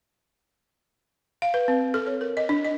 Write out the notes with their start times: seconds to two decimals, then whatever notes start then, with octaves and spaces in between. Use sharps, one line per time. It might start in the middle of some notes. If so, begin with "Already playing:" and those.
1.42 F5
1.54 B4
1.68 C4
1.94 A4
2.06 C#5
2.21 A#4
2.37 D#5
2.49 D4
2.65 D#5